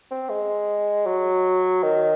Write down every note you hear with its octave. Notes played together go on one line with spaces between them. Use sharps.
C4
G#3
F#3
D#3